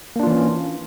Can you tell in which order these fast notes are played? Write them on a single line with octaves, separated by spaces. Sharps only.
A#3 D4 F4 E3 C#4